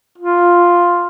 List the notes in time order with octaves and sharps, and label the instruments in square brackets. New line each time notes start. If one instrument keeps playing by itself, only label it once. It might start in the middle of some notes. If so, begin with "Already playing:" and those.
[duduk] F4